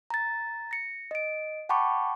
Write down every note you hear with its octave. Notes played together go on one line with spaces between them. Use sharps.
A#5 A6
A#6 C#7
D#5 D7
F#5 G5 A5 B5 C#6 D6